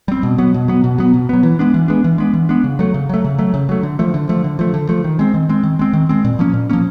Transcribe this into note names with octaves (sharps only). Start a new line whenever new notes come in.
G3 C4
B2
F#3 B3
B2
F#3 B3
B2
F#3 B3
B2
F#3 B3
E3
G#3 B3 D4
E3
G#3 B3 D4
E3
G#3 B3 D4
E3
G#3 B3 D4
C#3
F#3 A3
C#3
F#3 A3
C#3
F#3 A3
C#3
F#3 A3
D3
F3 A3
D3
F3 A3
D3
F3 A3
D3
F3 A3
D#3
G#3 C4
D#3
G#3 C4
D#3
G#3 C4
D#3
G#3 C4
A#2
F3 A#3 C#4
A#2
F3 A#3 C#4